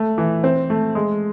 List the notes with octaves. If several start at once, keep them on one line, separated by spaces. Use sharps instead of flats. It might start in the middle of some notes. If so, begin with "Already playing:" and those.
Already playing: A3
E3
C4
A3
G#3